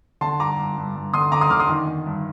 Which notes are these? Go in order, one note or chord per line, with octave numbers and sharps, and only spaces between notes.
D3 A5 C6
G2 A#5 D6
G2
G2
G2
D3 C6 D#6
D3 A#5 D6
C6 D#6
D3 D6 F6
C6 D#6
D#3
D#3
G2